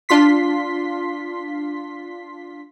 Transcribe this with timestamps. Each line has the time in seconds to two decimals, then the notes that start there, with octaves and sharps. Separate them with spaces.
0.09 D4 F4 C6 B6